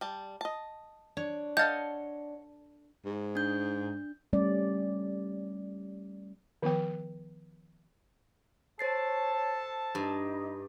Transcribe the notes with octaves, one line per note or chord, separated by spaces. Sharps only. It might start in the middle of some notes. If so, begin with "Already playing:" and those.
G3 A5
D#5 A5
D4 C#5
A4 C#5 D#5 F5 F#5 A5 G6 A6
G#2
D4 G6
G3 A3 C#4 D5
D#3 F3 B3 G5
A4 C5 C#5 A5 A6 C7
G2 D#4